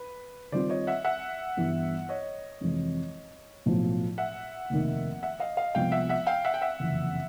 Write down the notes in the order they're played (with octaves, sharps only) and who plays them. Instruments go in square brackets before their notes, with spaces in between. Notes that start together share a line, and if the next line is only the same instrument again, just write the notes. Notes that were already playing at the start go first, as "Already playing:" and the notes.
Already playing: [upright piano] B4
[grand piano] D#3 G3 C4 F4 [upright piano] C5 D5
[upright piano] C#5 D#5
E5 F#5
E5 F#5
[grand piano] G2 E3 G3 B3 E4
[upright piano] C#5 D#5
[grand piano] F2 C3 E3 G#3
B1 A2 F3
[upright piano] E5 F#5
[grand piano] F1 D#2 D#3
[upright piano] E5 F#5
D#5 F5
D#5 F5
[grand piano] C2 C3 F3 G#3 B3 [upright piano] F5 G5
[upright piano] E5 F#5
E5 F#5
F5 G5
E5 F#5
G5
E5 F#5
[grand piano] F#1 F2 C3 E3